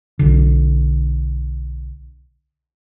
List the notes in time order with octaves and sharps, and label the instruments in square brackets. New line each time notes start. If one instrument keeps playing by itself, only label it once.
[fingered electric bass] B1 D3